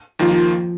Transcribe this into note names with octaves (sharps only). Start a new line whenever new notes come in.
D#2 D#3 F3 A#3 F4
F3